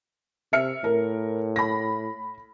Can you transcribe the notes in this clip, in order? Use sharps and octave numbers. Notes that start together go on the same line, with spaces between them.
C3 E5 F6 C#7
A2 A#4
B5 A#6